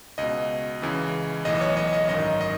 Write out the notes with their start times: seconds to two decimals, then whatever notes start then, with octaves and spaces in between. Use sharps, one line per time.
0.18 C#2 B2 D#5
0.82 C#2 C#3 E3
1.45 B1 A2 E3 D#5
1.61 C#5
1.77 D#5
1.93 D#5
2.09 G#1 F#2 D#3 D#5
2.41 D#5